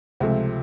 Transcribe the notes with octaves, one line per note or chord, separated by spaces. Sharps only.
C#2 C3 F3 A3